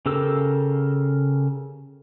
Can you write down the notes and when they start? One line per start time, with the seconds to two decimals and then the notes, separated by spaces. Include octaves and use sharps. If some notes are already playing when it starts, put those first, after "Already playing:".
0.06 C#3 G4 A4 A#4 E6